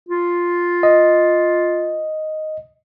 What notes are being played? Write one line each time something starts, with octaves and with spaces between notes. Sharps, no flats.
F4
D#5